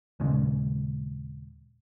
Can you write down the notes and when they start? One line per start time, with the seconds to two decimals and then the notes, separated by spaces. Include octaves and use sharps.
0.20 D#2 A#2 C#3 G#3